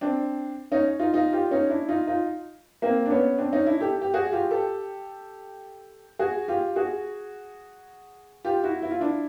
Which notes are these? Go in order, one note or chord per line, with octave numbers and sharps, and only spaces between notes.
C4 D4
C#4 D#4
D#4 F4
D#4 F4
F4 G4
C#4 D#4
D4 E4
D#4 F4
D#4 F4
A#3 C4
D4
B3 C#4
C4 D4
C#4 D#4
D4 E4
G4 A4
G4
F#4 G#4
F4 G4
G4 A4
F#4 G#4
F4 G4
F#4 G#4
F4 G4
E4 F#4
E4
F4
D4 E4